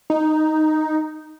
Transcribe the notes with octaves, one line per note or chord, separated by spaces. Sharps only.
D#4